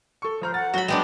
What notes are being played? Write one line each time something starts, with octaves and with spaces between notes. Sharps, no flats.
A4 C#6
F3 C5 A#5 F6
F#5 A6
F#3 F#4 B5 G7
G#3 B3 D4 G5